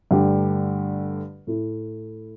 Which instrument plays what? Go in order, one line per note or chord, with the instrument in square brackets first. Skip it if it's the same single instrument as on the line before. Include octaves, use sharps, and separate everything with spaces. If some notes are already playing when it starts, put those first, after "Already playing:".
[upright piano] G2 D3 A3 G4
A2 A3 E4